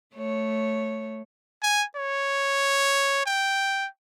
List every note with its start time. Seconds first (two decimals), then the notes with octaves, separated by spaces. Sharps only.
0.15 A3 C#5
1.63 G#5
1.96 C#5
3.26 G5